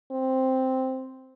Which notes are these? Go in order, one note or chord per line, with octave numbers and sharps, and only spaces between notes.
C4